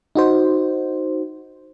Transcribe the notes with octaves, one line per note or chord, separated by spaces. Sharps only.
D#4 F#4 C5